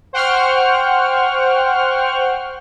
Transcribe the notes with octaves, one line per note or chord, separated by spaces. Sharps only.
C5 F#5 G5 C#6 F6